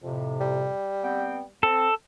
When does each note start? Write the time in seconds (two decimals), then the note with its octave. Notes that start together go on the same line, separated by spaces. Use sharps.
0.04 F2 A2 C3
0.40 G3
1.04 B3 C4 G5
1.63 C4 A4